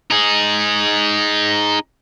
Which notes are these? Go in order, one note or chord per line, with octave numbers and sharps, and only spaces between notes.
D#4 G#4